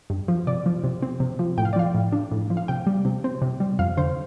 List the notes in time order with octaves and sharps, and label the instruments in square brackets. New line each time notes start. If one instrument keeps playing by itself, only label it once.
[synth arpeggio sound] G2
F3
C3 D5
F3
C3
C4
C3
F3
A2 G5
F5
D5
F3 F5
A2
D4
A2
F3
F5
C3 G5
G3
C3
C4
C3
G3
F2 F5
D3 C5